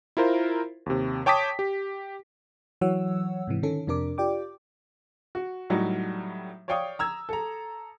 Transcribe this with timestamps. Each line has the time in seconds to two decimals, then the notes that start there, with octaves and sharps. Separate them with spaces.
0.17 E4 F4 A#4 C5
0.86 D#2 C3
1.26 C#5 G5 A5 D6 D#6 B6
1.59 G4
2.81 E3 F#3 C#5 F#5 E6
3.47 G#2 C3 E3
3.63 D3 D#3 C#4 A4
3.87 F2 C3 D4 A#4 D6
4.18 F4 G4 D5 G5 D6
5.35 F#4
5.70 A2 F#3 G3 D#4 F#4
6.68 C#5 D5 F5 G5 C#6 D#6
6.99 A#5 E6 G#6
7.29 A4 A#5